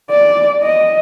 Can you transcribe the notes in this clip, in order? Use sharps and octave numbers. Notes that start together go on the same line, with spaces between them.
D5
D#5